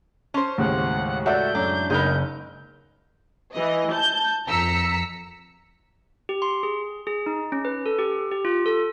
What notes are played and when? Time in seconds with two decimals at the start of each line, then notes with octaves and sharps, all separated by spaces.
0.34 C#4 C5 A5 C6
0.58 D#2 A2 C#3 G#3 F#5
1.26 F#4 A4 D5 E5 F#5 G6
1.55 F#2 D4
1.90 F#1 G#3 B3 D#4 G#4 A#4 G6
3.53 E3 D#5
3.91 A5 G6
4.47 F2 A#5 E6 B6 C#7
6.29 G4
6.42 C6
6.63 G#4
7.07 G#4
7.26 D#4
7.52 C#4
7.65 B4
7.86 A4
7.99 G4
8.31 G4
8.45 F4
8.66 A4